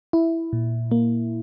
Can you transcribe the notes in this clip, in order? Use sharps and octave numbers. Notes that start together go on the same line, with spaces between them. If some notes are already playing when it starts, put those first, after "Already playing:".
E4
A#2
A#3